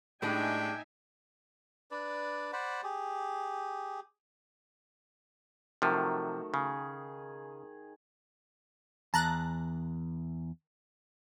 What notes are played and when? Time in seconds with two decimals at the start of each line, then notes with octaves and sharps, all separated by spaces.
0.22 A2 G3 G#3 D4 D#4 E5 G5 G#5
1.91 D4 B4 D5
2.53 C5 D5 F#5 B5
2.83 G4 G#4
5.82 C3 D#3 F3 F#3 A3
6.54 C#3 G#4
9.14 E2 A5 A#5 F#6